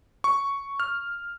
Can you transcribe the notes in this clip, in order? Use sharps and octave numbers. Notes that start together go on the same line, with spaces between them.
C#6
F6